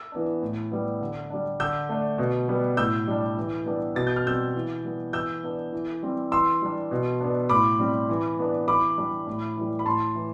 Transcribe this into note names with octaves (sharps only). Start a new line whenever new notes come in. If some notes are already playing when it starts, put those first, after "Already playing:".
Already playing: E6
E3 B3 D4
A2
G3 B3
D3
G3 D4
D3 E6 G6
A3 D4
B2
G3 B3
A2 E6 G6
G3 D4
E3
G3 B3 D4
B2 A6
G6
F6
G3 C4 E6 G6
E3
G3 B3
E3 E6 G6
B3 D4
E3
G3 C4
E3 C6 E6
G3 D4
B2
B3 D4
A2 B5 D6
G3 C4
E3
B3 D4
E3 B5 D6
G3 D4
A2
E3 G3
B5
A2 A5 C6
E3